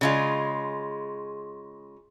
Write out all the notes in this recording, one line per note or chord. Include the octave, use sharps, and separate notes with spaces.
C#3 G#3 F4